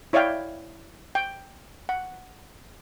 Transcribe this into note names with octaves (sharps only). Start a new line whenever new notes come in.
E4 C#5 D5 E5 F5 G5
G5
F#5